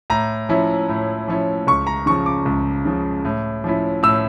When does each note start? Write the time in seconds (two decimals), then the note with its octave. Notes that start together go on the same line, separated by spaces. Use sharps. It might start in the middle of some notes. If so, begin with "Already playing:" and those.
0.10 A2 A#5
0.49 F3 C#4 E4
0.89 A2
1.28 F3 C#4 E4
1.67 C#2 C#6
1.87 A#5
2.06 C#3 F3 C#6
2.26 D6
2.45 C#2
2.85 C#3 F3
3.25 A2
3.64 F3 C#4 E4
4.03 A2 E6